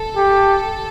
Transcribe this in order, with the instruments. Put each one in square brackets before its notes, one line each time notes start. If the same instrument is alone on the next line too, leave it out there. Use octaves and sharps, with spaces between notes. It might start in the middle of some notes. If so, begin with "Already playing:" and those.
Already playing: [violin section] A4
[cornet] G4